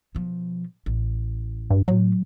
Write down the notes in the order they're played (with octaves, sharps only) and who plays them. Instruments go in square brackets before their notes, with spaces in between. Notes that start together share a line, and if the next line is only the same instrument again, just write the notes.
[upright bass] B2 F3
A1
[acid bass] G2
[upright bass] A2 A3 [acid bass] F#3